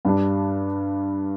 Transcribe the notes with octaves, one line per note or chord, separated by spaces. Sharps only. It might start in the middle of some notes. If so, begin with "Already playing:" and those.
G2 G3 D4